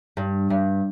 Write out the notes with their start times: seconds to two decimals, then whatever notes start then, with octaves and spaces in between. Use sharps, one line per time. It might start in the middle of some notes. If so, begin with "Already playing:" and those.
0.17 G2
0.50 G2